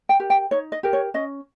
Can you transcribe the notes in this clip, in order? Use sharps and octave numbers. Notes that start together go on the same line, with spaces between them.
G5
G4 A#4
G5
D#4 C#5
D#5
G4 A#4
C#5
C#4 D#5